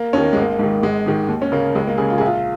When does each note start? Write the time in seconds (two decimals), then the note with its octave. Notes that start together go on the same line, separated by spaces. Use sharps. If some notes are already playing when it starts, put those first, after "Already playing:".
Already playing: A#3
0.13 D#2 D#3 C#4
0.24 A#3
0.33 G#1 G#3
0.42 A#3
0.59 G#2 D#3
0.83 G#1 G#3
1.06 G#2 D#3
1.28 D#2
1.42 C#4
1.52 C#3 A#3
1.75 C#2 G#3
1.87 A#3
1.98 C#3 G#4
2.10 F4
2.18 A#1 G#4
2.26 F4